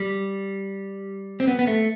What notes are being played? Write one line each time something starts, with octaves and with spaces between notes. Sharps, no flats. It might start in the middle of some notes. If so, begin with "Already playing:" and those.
Already playing: G3
C4
B3
B3
A3